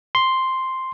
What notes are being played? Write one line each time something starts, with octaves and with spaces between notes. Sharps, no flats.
C6